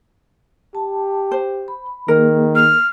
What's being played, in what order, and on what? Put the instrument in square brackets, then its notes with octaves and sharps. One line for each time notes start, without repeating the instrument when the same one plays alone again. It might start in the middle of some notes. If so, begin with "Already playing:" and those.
[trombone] G4 [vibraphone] A5
[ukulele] C5
[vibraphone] B5
[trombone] D#3 [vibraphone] A#3 G#4 [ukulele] A#4
[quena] F6